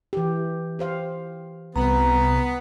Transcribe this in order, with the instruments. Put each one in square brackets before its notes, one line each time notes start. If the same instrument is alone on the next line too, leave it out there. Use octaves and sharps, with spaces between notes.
[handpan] E3 G4
G4 C5 F5
[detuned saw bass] C2 [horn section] B3 [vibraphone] A#5